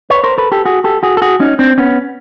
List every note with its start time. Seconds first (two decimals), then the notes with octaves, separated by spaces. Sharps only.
0.10 B4 C#5
0.24 A#4 C5
0.38 A4 B4
0.52 G4 A4
0.65 F#4 G#4
0.84 G4 A4
1.03 F#4 G#4
1.17 A4
1.22 F#4 G#4
1.40 C#4 D#4
1.59 C4 D4
1.78 B3 C#4